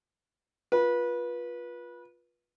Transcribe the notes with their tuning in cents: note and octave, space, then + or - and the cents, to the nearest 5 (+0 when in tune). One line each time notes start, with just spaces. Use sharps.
F4 +10 B4 -25